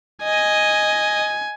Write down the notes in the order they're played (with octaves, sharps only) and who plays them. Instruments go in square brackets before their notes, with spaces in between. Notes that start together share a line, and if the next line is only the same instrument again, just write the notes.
[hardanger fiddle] D#5 [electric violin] G#5